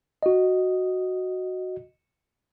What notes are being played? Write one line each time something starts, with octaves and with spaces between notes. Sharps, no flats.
F#4 D#5